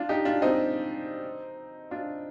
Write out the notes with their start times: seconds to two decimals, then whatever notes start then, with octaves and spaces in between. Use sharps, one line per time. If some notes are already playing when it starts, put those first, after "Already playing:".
Already playing: D4 F4
0.09 D#4 G4
0.25 D4 F4
0.42 C4 D#4
1.91 D4 F4